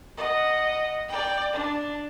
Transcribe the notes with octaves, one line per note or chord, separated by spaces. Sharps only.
D#5 F#5
D5 G5
D4